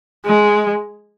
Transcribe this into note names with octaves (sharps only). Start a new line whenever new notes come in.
G#3